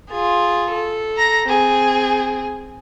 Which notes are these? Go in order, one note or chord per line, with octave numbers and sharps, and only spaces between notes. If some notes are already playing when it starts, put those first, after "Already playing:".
F4 G#4
A4
A#5 A#6
C4 G#4